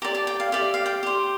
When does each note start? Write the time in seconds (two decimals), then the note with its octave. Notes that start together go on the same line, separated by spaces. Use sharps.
0.02 G4 D5 A#5
0.15 A5
0.27 G5
0.40 F5
0.52 G4 D5 E5
0.74 F5
0.86 G5
1.03 G4 C5